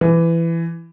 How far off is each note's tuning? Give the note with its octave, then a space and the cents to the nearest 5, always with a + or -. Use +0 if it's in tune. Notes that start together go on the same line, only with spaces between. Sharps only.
E3 +15